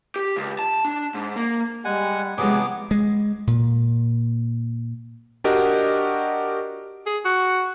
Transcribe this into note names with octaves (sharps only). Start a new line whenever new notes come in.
G4
C#2
A5
D4
G#2
A#3
G3 G#3 F#5 G#5
A1 C3 F3 F#3 G#3 B3 G#4 D6
G#3
A#2
D4 F#4 G4 A#4 D#5 F#5
G#4
F#4